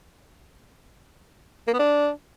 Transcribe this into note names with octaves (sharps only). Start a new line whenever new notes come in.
A#3
B3
D4